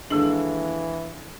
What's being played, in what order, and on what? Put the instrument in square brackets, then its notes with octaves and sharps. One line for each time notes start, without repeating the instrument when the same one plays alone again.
[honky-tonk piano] D#2 E6 F#7 [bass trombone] E3 [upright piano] G#3 A4 [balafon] D4